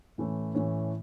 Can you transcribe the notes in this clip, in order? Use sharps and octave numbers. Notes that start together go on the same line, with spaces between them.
A2 E3 A3 C#4
A2 E3 A3 C#4